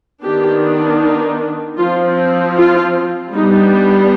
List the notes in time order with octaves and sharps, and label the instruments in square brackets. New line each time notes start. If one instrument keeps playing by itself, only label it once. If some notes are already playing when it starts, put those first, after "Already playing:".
[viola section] D#3 B3 D4 G4
D#4
F3 C4 F4
F4
G3 B3 D4 D#4